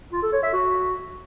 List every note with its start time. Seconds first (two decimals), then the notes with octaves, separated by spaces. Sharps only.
0.12 F4
0.22 A4
0.33 C#5
0.43 E5
0.53 F#4